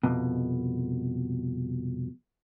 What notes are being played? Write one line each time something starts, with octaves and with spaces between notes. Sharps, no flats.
C2 F2 B2